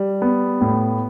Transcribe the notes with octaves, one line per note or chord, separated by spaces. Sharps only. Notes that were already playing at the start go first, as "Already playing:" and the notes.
Already playing: G3
B3
A2